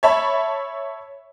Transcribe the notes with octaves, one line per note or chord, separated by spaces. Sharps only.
C#5 E5 A5 B5